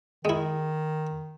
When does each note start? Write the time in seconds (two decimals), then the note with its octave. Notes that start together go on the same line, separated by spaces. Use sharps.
0.25 D#3 G#3 E4